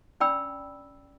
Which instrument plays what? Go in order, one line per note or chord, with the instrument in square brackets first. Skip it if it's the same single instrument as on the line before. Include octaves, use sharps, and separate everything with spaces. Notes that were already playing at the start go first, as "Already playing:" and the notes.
[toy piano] C#4 D4 D5 G5 B5 E6